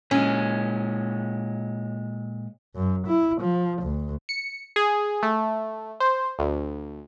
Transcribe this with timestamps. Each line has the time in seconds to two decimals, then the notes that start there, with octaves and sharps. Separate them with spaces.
0.11 A#2 G#3 C#4
2.76 F#2
3.07 E4
3.41 F3
3.82 D2
4.29 C#7
4.76 G#4
5.23 A3
6.00 C5
6.39 D2